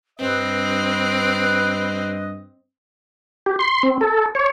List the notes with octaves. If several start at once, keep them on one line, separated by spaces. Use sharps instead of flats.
G2 C4 B4 D#5
G4
C6
C4
A4
C#5